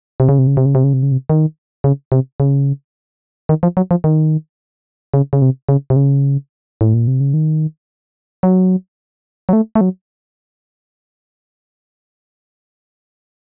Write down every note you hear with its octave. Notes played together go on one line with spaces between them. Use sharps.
C3
C#3
C3
C#3
C3
C#3
C3
C#3
C3
C#3
C3
D#3
C#3
C3
C#3
D#3
F3
F#3
F3
D#3
C#3
C#3
C3
C#3
C3
C#3
A2
A#2
C3
C#3
D#3
F#3
F#3
A3
A3
F#3